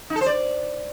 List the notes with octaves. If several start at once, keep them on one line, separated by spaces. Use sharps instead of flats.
D#4
A4
C5
D5